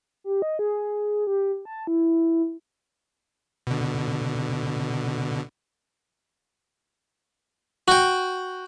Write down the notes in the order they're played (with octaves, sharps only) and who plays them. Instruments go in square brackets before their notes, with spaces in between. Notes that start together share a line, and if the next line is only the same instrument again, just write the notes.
[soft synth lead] G4
D#5
G#4
G4
A5
E4
[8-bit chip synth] B2 D3
[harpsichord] F#4 G5